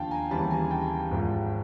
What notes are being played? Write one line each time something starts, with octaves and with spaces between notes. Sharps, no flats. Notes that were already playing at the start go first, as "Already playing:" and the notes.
Already playing: D#2 D3 F3 F5 G5 A5
G#5 A#5
D#2 C#3 E3 G3 A5 B5
G#5 A#5
G5 A5
G#1 G#2 F3